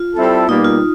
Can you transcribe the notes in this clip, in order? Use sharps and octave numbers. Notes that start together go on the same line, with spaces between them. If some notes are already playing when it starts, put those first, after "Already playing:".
Already playing: F4
G3 C4 E4 A4
B2 G3 A#3 D#4
F4